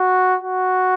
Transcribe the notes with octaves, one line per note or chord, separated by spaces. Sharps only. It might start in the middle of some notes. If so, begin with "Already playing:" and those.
Already playing: F#4
F#4